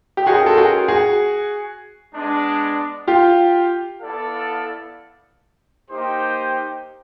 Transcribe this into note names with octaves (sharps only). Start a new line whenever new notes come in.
G4
C#4 F4 F#4 G#4 A#4 D#5 G5
A4
F#4 G#4
F#4 G#4
G#3 B3 D4
F4 G4
B3 E4 A4 D5 F5
A#3 D#4 G4 C5